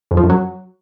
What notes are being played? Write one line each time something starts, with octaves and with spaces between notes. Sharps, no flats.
F2
F3
F#2
F#3